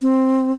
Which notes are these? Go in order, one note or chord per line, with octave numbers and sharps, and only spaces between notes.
C4